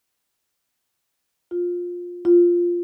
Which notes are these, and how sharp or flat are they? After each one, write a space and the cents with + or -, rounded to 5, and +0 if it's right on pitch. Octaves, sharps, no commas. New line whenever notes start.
F4 +15
F4 +0